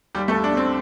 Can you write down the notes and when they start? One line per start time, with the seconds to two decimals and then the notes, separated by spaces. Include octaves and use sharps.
0.15 D#2 G3 G4
0.28 A3 A4
0.34 D#2
0.44 D4
0.53 A3 C4